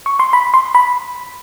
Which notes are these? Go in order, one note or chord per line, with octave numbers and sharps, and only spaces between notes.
C#6
C6
B5
C6
B5